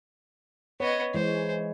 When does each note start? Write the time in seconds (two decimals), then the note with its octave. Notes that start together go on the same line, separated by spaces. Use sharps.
0.80 B3 C#5 D#5
1.14 E3 G#3 C5